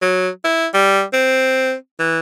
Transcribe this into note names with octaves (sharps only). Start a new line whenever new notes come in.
F#3
E4
G3
C4
E3